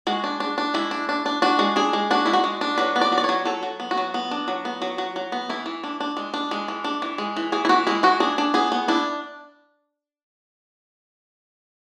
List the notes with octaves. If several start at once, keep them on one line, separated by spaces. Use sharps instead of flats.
G#3 F#4
D4
D4
D4
G#3 E4
D4
D4
D4
D4 F#4
G#3
D4 G#4
G#3
D4 F#4
G#3 E4
F#4
G#3
D4
F#3 B4
B3
D5
F#3
D5
F#3 C#5
F#3 A4
F#3
B3
F#4
F#3
B3
D4
F#3
B3
F#3
F#3
F#3
B3
E3 E4
E3
D4
D4
G#3
D4
G#3
E3
D4
E3
G#3
E3
E3 G#4
E4
E3 F#4
G#3 E4
E3 F#4
D4 G#4
D4
B3 G#4
B3
D4 E4